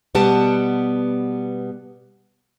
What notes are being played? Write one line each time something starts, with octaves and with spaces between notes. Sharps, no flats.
B2 G3 B3 G4 F#5 A5